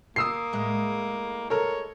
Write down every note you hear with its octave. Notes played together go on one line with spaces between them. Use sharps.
A#3 D#6 E6 C7
A2 G#3
A4 A#4 C#5